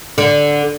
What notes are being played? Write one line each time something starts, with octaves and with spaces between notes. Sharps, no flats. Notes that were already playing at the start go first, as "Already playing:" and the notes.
D3